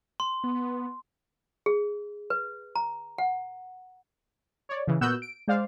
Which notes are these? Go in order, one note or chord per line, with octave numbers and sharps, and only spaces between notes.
C6
B3
G#4
B4
A#5
F#5
C#5 D5
C#3 E3
A#2 B3 F#4 E6 F#6 G6
D7
G#3 C5 D5 F5